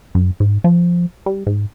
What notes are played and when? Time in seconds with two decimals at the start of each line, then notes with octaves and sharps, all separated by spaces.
0.15 F#2
0.40 G#2
0.64 F3
1.26 G3
1.46 G#2